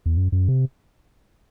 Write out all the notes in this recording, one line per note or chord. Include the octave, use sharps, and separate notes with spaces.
E2
F#2
F#2
C3